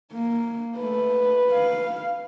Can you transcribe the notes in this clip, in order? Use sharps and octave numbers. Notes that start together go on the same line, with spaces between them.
A#3
A3 B4
F5